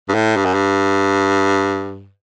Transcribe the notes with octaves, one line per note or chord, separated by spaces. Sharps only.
G2
A2
G2
F#2
G2